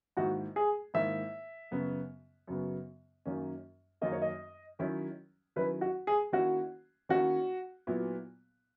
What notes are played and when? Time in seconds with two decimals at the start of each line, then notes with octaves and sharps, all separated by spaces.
0.17 G#2 D#3 A#3 E4 F#4
0.56 G#4
0.94 G#2 D#3 A#3 E4 E5
1.71 F#2 C#3 F#3 B3
2.47 F#2 C#3 F#3 B3
3.26 F#2 D#3 A#3 C#4
4.01 F#2 D#3 A#3 C#4 D#5
4.12 C#5
4.22 D#5
4.79 D#3 F#3 C#4 E4
5.56 D#3 F#3 C#4 E4 B4
5.81 F#4
6.07 G#4
6.32 D#3 A#3 C#4 E4 F#4
7.09 D#3 A#3 C#4 E4 F#4
7.87 A#2 F#3 B3 E4